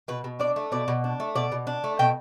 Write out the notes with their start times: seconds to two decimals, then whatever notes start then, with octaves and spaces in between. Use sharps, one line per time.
0.08 B2 B4
0.24 B2
0.39 D4 D5
0.56 A3
0.72 B2 D5
0.88 B2
1.04 D4
1.20 A3
1.36 B2 D5
1.52 B2
1.67 D4
1.84 A3
1.99 B2 G5